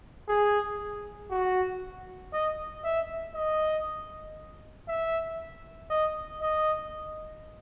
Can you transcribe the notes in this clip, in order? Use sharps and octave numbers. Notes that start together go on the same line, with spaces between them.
G#4
F#4
D#5
E5
D#5
E5
D#5
D#5